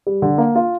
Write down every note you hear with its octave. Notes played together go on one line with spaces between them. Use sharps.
G3
D3
A#3
F4